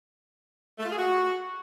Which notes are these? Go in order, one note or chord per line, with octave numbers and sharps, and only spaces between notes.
A3
F4
G#4
F#4